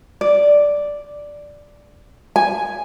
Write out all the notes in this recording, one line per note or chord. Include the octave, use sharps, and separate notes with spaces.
D5
G#5